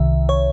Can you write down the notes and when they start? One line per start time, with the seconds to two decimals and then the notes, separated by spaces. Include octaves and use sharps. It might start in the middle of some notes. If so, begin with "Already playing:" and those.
Already playing: C2 C3 D#3 E5
0.29 C#5